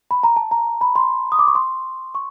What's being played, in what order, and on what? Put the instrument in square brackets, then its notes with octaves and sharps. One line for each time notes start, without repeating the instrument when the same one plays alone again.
[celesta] B5
A#5
A5
A#5
B5
C6
D#6
D6
C#6
C6
C#6